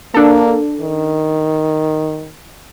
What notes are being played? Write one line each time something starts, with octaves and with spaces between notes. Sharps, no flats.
A#3 D4 A4
D#3